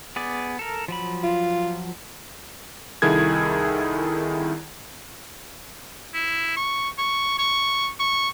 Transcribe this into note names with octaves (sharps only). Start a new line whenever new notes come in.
B3 G#4 D5
A4 A#4
F3 F#3 B5
F4
C2 D#3 E4 G#4 A4 G#6
E4
C#6
C#6
C#6
C#6